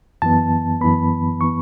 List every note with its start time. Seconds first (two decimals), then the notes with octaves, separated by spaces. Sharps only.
0.22 F#2 E3 B3 A5
0.81 F#2 E3 B3 B5
1.41 E3 B3 C#6